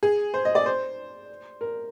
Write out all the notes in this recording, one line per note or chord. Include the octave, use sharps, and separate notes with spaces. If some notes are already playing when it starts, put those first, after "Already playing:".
G#4
C5
D#5
D5
C5
A#4